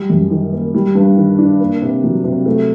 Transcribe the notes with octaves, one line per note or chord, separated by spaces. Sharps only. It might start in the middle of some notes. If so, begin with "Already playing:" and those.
Already playing: G3
F#2
D#3
A#3
G3
G2
D#3
D4
A#3
C3
F#3
C3
A3